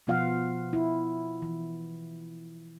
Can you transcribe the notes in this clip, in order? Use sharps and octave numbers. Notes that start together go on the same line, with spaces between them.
B2 F3 B3 F4 F5 F#5
E4
E3